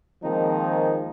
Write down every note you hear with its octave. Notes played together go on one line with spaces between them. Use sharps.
D#3 F3 G#3 A#3 C4 D#4